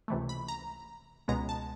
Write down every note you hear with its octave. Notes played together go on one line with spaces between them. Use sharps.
C#2 C3 E3 A3
B5
A#5
C#2 B2 G#3 B3 A#5
A5